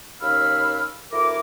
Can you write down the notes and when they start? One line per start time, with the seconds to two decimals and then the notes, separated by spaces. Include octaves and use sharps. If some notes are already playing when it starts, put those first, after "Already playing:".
0.22 D#2 C#4 F5 B5 E6 F6
1.12 D2 E4 A#4 D6